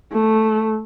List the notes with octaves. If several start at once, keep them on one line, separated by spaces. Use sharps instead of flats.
A3